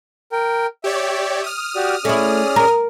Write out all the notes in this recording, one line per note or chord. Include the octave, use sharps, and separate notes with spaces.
A#4 G5
G4 C#5 D5 E5
D#6 F6
F#4 G4 D5
A3 C#4 E4 G#4 D5
A#4